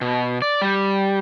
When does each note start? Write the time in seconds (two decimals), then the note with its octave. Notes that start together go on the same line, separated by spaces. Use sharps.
0.01 B2
0.42 D5
0.62 G3